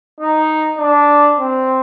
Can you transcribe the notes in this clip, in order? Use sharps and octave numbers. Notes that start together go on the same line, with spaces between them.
D#4
D4
C4